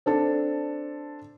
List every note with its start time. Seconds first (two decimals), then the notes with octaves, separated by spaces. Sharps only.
0.06 C4 D4 A4